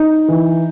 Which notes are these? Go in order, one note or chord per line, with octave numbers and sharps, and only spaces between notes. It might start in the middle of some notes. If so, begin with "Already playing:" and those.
Already playing: D#4
E3